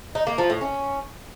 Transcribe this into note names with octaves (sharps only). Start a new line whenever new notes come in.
D#4
A#3
F3
A2
C#4